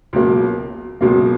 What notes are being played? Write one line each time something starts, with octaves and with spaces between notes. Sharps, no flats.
C#2 B2 F#3 A#3
C#2 B2 F#3 A#3